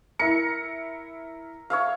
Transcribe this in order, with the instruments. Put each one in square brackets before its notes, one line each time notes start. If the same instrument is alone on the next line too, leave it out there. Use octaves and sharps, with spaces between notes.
[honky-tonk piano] E4 C#7 [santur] A#4
[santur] C#5 E5 F5